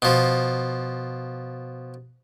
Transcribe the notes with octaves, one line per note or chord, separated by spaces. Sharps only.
B2 F3